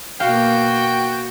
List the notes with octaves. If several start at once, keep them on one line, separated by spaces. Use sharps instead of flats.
B2 A#3 F#4 F5 G5